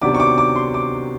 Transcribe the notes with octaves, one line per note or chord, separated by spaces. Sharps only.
C3 D#3 F#3 B3 D4 D6
C#6
D6
D6
C6
D6